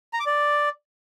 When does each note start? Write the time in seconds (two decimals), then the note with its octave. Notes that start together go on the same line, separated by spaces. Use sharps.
0.13 A#5
0.20 D6
0.26 D5